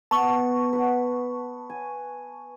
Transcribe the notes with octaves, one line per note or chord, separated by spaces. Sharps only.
B3 A5 C#6
B4 F#5
G#5